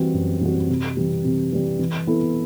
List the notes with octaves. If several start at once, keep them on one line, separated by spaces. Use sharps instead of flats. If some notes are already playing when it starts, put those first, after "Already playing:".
Already playing: E3 G3 C4 F#4
F#2
E3 G3 C4 F#4
C3
E3 G3
C3
E3 G3
E3
B3 E4 A4